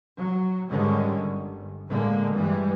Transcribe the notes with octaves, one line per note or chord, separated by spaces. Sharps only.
F#3
G#2 D3 D#3 G3 G#3 C#4
G1
A2 D3 G#3 A#3
G2 E3 G3 G#3